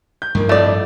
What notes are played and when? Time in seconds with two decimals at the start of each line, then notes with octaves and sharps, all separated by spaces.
0.22 G6
0.35 G2 D#3 F3 A#3
0.49 A1 F2 A3 D5 D#5